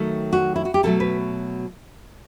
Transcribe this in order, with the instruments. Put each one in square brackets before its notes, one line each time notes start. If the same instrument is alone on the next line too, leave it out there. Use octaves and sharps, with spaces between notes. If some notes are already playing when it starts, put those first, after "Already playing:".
Already playing: [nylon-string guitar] D#3 F#3 A3 A4
F#4
E4
F#4
G4
B2 F#3 A3 A4
B4